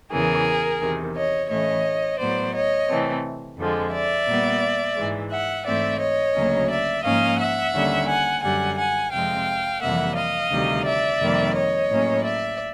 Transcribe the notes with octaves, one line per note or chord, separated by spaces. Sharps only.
E2 C#3 E3 G#4 A#4
E2 C3 D#3
C#5 D#5
A2 E3 A3 C#4 C#5 D#5
A2 F#3 B3 C5 D5
C#5 D#5
C3 E3 A3 C4
F2 D3 F3 G#3
D5 E5
A#2 G3 B3
G#2 E3 G#3
E5 F#5
G#2 E3 A3 C4 D5 E5
C#5 D#5
D2 C#3 F#3 A#3 C#4
D5 E5
G#2 F3 A#3 C#4 D#5 F5
E5 F#5
D#2 D3 G3 A#3 C#4
F#5 G#5
F#2 D3 G3 F#5 G#5
F#5 G#5
F2 C3 F3 G#3 C4 F5 G5
F2 C3 E3 G3 A#3 E5 F#5
D#5 F5
D2 C3 D#3 G3
D5 E5
F2 C3 D#3 G3 A#3
C#5 D#5
A2 F#3 A#3 C#4
D5 E5